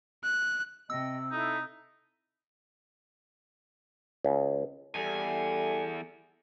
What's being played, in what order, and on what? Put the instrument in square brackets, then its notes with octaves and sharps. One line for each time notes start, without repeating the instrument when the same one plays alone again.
[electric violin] F#6
[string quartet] C3 [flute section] D#5 G5 [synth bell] E6
[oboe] D#4 [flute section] E4 A4
[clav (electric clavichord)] C#2
[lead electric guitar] E2 [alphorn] G3 [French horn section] E4 A4 [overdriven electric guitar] G#5